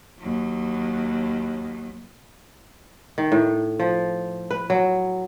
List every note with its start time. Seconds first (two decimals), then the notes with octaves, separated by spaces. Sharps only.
0.19 D#2 F#3
3.18 D#3
3.32 A2
3.80 F3
4.51 B4
4.70 F#3